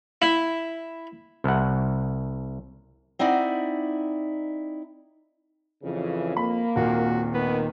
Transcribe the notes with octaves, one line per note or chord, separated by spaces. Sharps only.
E4
C2 F#5
C4 D#4 E4 D5 F#5
F2 C#3 E3
A#3 B5
D#1 A#2 C4 F4 F#4
D#3 B3